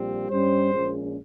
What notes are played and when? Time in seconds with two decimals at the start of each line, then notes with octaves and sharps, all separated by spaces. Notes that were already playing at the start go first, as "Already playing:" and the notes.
Already playing: A#1 A#2 G3 C4
0.30 G2 G3 C#4 C5
0.73 A#1 A#2 G#3 C#4